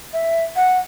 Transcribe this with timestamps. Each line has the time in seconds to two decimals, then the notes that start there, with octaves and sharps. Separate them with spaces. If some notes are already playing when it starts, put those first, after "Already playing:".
0.13 E5
0.56 F#5